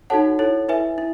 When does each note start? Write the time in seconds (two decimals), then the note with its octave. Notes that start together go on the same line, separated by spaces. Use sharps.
0.10 D#4 F#4 A4 C#5 F#5 A5
0.39 E4 A4 C#5
0.69 E4 B4 E5 G#5
0.98 E4